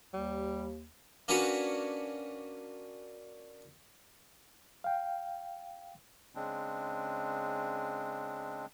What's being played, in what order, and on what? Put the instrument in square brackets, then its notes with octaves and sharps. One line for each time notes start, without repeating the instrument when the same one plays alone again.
[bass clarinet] D#2 [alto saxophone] G3
[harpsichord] A#3 C#4 D4 F#4 B4 C#5
[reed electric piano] F5 G5
[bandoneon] C#3 G#3 C4 D4